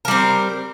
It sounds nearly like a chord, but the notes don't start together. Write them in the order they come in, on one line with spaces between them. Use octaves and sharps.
A#4 G3 C4